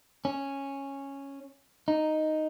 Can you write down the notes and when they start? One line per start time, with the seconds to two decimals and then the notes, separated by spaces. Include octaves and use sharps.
0.25 C#4
1.88 D#4